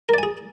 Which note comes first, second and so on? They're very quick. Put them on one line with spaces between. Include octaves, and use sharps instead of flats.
A#4 D5 G#5 G#4